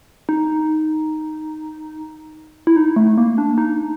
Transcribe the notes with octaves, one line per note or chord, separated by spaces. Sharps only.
D#4
E4
D#4
A3
A#3
D4
D#4